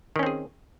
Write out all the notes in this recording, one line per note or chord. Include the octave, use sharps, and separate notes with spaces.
D#3 C4 C#4 G#4